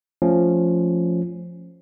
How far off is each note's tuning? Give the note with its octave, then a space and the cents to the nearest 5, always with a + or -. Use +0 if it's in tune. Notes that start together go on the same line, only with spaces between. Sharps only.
F3 +0 A3 +0 C#4 +0